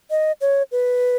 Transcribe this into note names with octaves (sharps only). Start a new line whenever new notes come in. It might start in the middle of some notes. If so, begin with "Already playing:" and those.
D#5
C#5
B4